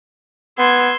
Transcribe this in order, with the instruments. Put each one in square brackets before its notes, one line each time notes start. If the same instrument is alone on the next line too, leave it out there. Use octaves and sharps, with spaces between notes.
[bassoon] B3 [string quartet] C6 E6 G#6